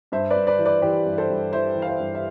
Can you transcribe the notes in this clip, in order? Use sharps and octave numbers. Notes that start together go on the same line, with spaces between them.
G2 C5 E5
B4 D5
G2
B4 D5
E3
B4 D5
E3 G4 B4
G2
A4 C5
G2
E3 C5 E5
E3
F5
C5 E5
G2
E5